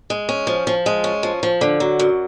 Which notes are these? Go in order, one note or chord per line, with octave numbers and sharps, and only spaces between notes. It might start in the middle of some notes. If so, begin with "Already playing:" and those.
G#3
C#4
F3
F3
G#3
C#4
F3
F3
D3
F#3
F#2